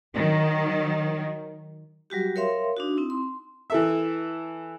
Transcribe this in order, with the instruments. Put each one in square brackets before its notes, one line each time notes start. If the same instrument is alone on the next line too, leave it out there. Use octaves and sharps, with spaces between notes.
[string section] D#3 F#3
[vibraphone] F#3 G3 F#4 G4
A#4 C#5 E5 F5 C6
D4 D#4 F#4
C4 D#4 E4
C6
[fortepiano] E3 A4 E5